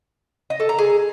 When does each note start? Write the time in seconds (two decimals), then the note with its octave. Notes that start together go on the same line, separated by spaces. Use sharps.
0.50 D#5
0.60 A4
0.69 A#5
0.78 G#4